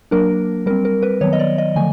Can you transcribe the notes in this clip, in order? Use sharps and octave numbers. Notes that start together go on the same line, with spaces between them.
F#3 A#3 D4 A#4
G3 C4 A#4
A#4
B4
D#3 F#3 B3 C#5
D#5
D5
D#5
D3 F3 A3 G#5